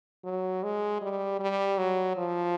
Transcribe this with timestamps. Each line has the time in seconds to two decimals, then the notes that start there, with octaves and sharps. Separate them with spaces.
0.24 F#3
0.63 G#3
1.02 G3
1.40 G3
1.78 F#3
2.17 F3